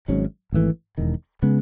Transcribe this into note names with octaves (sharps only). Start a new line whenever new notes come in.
G#1 G#2 F#3 C#4
G#1 F#2 E3 A3
E1 E2 D#3
C#3 G#3 B3